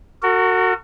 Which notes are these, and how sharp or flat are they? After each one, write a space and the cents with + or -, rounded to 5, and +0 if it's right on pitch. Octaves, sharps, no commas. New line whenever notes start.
F#4 +0 A#4 -45